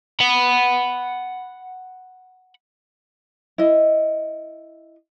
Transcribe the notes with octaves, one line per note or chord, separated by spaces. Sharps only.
F#5 B5
E4 D#5